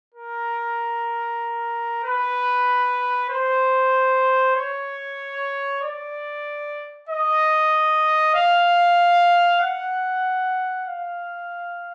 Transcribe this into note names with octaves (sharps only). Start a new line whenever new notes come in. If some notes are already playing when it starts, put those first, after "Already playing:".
A#4
B4
C5
C#5
D5
D#5
F5
F#5
F5